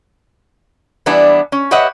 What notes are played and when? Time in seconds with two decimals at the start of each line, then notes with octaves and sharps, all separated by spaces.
1.06 E3 G3 B3 D4 E4
1.52 C#4
1.71 G4 B4 C#5 D#5 E5 F#5